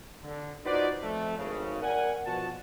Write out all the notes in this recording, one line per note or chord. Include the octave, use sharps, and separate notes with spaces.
D3
D#4 F4 F#4 B4 C5 D5
F2 A3
G#1 C#3
A#4 D5 F#5 G#5
B2 F3 F#4 A5